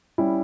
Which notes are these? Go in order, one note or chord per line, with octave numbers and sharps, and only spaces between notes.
G3 C#4 E4